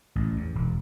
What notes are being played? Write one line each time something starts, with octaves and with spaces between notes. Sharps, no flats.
A1
E2
E1